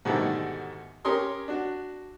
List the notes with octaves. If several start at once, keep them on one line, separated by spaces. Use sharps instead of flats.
G#2 B2 D3 D#3 G3 A3
C#4 G4 A#4 C#5 C6 D#6
D4 F#4